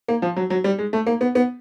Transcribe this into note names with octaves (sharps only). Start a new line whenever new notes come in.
A#3
F3
F#3
F#3
G3
G#3
A3
A#3
B3
B3